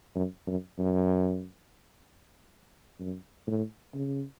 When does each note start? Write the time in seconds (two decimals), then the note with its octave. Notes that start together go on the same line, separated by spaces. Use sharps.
0.15 F#2
0.47 F#2
0.79 F#2
3.00 F#2
3.47 A2
3.94 C#3